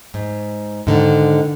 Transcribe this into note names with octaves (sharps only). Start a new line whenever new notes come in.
G#2
G#2 D3 D#3